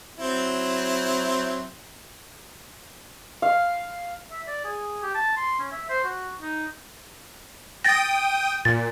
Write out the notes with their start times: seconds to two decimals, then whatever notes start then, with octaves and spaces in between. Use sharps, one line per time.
0.19 F#3 C4 E4
3.42 F5
4.31 E5
4.48 D5
4.65 G#4
5.03 G4
5.15 A5
5.37 C6
5.60 C#4
5.72 E5
5.90 C5
6.04 F#4
6.41 D#4
7.84 G5 D#6 A6 A#6
8.65 A#2 A6